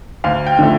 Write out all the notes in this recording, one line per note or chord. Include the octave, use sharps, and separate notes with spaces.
D2 F5
G5
D3 F3 A3